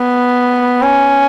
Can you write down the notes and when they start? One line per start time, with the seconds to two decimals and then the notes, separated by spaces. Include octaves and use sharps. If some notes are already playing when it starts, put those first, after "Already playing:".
Already playing: B3
0.81 C#4